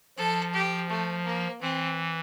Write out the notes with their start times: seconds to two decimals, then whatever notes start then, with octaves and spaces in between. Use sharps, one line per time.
0.17 F3 A4
0.54 G4
0.89 A3
1.25 A#3
1.61 E3 C4